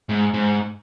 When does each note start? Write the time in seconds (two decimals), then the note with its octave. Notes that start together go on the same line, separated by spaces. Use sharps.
0.09 G#2
0.34 G#2